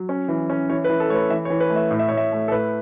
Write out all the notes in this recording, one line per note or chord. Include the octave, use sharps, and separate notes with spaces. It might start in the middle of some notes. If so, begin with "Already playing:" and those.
Already playing: F#3
C#4
E3
C#4
E3 C#5
B4
E3
A4
A3 B4 C#5
E3 E5
C#5
E3
B4
A3
E5
A2
E5
A2 C#5
E5
A3
A4
A2 B4